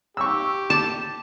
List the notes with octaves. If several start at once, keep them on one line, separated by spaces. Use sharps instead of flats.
G4 C#6 E6
A5 D6